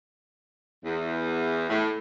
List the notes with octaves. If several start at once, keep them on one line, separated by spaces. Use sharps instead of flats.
E2
A2